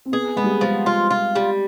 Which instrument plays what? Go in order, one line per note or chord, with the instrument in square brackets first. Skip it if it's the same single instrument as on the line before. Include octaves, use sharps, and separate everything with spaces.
[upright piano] C4
[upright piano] B3 [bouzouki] G#4
[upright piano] G#3 [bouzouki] B3
[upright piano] G3
G#3
[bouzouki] F3 [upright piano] G#3
[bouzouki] F4
F4
G3